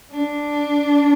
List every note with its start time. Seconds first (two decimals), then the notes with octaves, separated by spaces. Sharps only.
0.11 D4